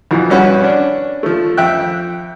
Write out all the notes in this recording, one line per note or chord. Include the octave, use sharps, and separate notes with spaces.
F2 B2 E3
G2 C#4 F#4 B4
C#4 D4
F3 A3
F2 E5 G5 F#6